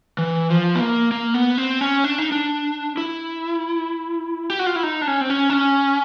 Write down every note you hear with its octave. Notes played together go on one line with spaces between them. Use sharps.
E3
F3
B3
A#3
A#3
B3
C4
C#4
D4
D#4
D4
E4
G4
F#4
F4
E4
D#4
D4
C#4
C4
C#4
D4
C#4